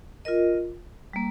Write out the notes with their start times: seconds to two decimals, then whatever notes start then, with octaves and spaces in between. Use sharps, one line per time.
0.25 F4 A#4 D#5
1.13 G3 A#3